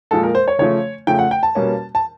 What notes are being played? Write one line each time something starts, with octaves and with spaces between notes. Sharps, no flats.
A#2 F3 G#3 A4
A#4
C5
C#5
C#3 F3 A3 C#5
C#3 F3 A3 G5
F#5
G5
A5
B2 G3 A#3 C#4
A5